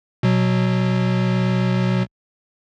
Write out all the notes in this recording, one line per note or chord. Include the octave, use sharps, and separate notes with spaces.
B2 F#3